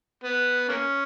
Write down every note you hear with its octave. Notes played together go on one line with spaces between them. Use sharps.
B3
A#3 C#4